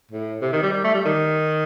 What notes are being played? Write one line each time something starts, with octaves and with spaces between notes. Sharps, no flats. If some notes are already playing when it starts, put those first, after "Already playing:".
A2
C3
D#3
G3
G3
A3
G3
D#3